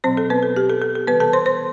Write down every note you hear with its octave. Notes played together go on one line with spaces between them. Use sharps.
B2 F#3 C4 C5
A4
B3 B4
A4
G4
A4
A4
A4
C3 E3 G3 B3 B4
A4 A5
C5 C6
C5 C6